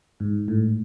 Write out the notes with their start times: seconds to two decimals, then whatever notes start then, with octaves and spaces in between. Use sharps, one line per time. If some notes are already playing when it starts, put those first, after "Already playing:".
0.20 G#2
0.48 A2